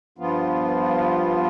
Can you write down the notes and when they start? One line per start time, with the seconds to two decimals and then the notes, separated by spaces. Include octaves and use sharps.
0.18 G2 F3 B3 F4